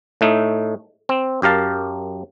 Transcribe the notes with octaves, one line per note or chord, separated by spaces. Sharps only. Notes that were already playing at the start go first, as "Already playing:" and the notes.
A2 A3 D#4
C4
F#2 G4 A#4 F5 A5